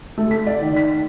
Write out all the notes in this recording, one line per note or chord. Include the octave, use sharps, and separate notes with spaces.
A3
B6
D5
D#3
B6